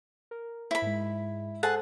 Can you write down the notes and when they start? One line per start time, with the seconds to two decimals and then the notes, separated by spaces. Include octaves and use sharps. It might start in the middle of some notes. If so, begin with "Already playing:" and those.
0.31 A#4
0.71 E4 C5 B5
0.82 G#2 G#3
1.63 G#4 A4 C5 F#5 G#5 A5